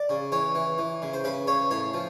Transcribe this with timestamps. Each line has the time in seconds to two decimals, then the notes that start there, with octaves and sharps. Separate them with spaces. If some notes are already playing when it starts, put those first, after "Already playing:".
Already playing: D5
0.09 C#3
0.32 E3 C#5
0.55 E3
0.78 E3
1.02 C#3
1.14 C5
1.24 C#3 B4
1.47 C#3 C#5
1.71 A2 C#5
1.94 F3